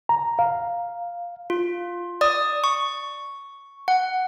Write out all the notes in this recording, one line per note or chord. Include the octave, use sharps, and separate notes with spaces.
A#5
F5
F4
D5 D#6
C#6
F#5